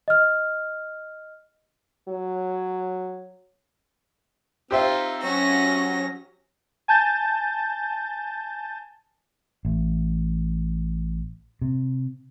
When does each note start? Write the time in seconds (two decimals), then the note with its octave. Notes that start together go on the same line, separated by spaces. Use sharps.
0.08 D#5 F6
2.08 F#3
4.71 C4 D#4 F4 G4 C5 E5
5.24 F#3 C#4 F#4 C#5 A#6
6.88 G#5 A5 G6 A6
9.65 A1
11.62 C3